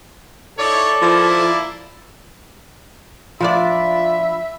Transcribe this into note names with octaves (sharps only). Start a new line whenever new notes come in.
D#4 E4 A4 C#5 D5
F3 A#3 E4
F3 D4 F4 D5 E5 B5